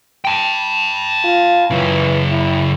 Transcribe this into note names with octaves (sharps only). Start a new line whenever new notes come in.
G5 A5
F4
F#2 C#3 E3
E4